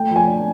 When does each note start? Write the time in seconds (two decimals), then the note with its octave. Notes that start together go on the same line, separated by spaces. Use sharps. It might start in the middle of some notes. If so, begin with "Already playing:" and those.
Already playing: A3 G5
0.10 F3
0.16 G#5
0.27 D4